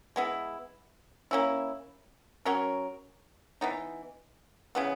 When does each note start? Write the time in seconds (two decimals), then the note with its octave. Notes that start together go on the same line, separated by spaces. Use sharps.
0.16 G#3 B3 E4
1.31 A#3 C#4 E4
2.45 F#3 C#4 F#4 A#4
3.61 E3 B3 D#4
4.75 C#3 E3 B3